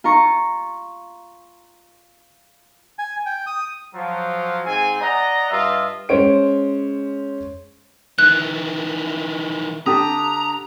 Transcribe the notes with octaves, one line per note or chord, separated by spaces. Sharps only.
F4 A#5 C#6
G#5
G5
D#6
F3 F#3
G#2 C4 G#5
D5 D#5 F#5 A#5
G2 F4 D#5 E5
G#3 C#4 C5 C#5 D7
D#3 E3 F#6
D3 G4 A5 A#5 D#6